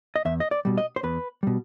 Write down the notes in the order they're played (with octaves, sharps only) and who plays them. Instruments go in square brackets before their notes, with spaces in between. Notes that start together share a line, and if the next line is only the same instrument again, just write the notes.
[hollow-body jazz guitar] D#5
E2 E5
D#5
D5
B2 G3
D#5
C5
E2 B4
B2 G3